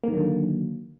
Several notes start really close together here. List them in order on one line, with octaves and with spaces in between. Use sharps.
A#3 D#3 F#3 D3